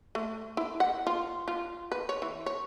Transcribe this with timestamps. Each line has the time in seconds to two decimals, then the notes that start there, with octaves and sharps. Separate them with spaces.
0.15 A3
0.57 E4
0.80 F#5
1.07 F4
1.48 F4
1.92 B4
2.09 C#5
2.22 E3
2.46 C#5